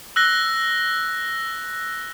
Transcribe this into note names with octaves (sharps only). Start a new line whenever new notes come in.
E6 F#6 A#6 G7